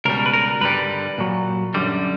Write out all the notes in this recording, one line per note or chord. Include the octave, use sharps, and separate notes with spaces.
C#2 B2 G3 A#4
B4
A#4
G2 D3 G3 B4
A#2 F#3
F#2 D3 G3